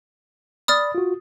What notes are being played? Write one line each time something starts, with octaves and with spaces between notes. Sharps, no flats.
D5 B5 D#6 F6 A6
F4 F#4